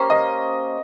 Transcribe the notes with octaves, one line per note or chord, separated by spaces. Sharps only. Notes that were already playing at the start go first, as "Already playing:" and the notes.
Already playing: A#3 C#4 G4 C5
D#5